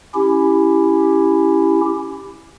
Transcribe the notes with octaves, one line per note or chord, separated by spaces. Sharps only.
C#4 E4 G4